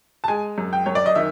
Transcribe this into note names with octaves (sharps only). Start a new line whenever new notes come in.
A5
G#3 G#5
F#2
G5
F#2 C#5
D5
D#5
D#3 E5